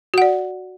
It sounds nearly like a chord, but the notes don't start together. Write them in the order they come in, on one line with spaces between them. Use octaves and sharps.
F#4 F#5 D5